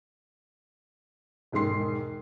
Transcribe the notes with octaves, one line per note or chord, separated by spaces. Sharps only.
E1 G#2 D#3 C6 C7